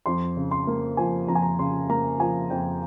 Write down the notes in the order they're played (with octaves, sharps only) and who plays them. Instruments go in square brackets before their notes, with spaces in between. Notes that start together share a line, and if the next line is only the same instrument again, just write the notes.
[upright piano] F2 C6
C#3
C6
A#3
F3 G#5
F2 A#5
G#5
A#5
C#3 C6
A#3 A#5
F3 G#5
F2 G5